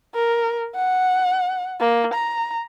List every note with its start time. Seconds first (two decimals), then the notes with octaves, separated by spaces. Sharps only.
0.14 A#4
0.75 F#5
1.80 A#3
2.14 A#5